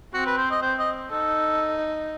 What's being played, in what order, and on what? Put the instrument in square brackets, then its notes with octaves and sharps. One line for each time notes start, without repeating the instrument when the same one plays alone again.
[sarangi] C4 [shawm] F#4
[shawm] B4
C5
D#5
[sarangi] C4 [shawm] C5
[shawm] D#5
[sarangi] D#4 [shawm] A4